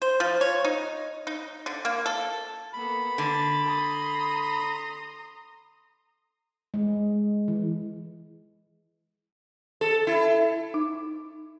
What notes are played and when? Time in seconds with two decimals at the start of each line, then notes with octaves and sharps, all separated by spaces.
0.02 C5
0.20 F3
0.41 C#5
0.64 D#4
1.27 D#4
1.66 D3
1.85 A#3
2.06 A4
2.73 A#3 B3 A4 B5
3.18 D3 A6
3.65 A#5 C6 D#6
6.74 G#3
7.48 E3
9.81 A4
10.07 E4
10.74 D#4